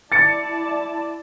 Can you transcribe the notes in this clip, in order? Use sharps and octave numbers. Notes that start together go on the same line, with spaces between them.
E4 D5 A5 A6 C#7